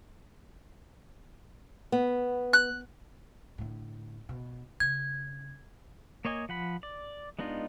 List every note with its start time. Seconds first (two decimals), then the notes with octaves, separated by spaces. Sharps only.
1.92 B3
2.53 F#6
3.58 A2 D3
4.29 B2
4.80 C#3 G#6
6.25 A#3 C#5 D#5 G#5
6.49 F3 F#5 B5
6.83 D5
7.39 G#3 B3 D4 D#4 F4